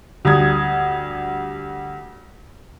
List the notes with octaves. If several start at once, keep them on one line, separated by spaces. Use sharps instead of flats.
D2 G3 D#6 G#6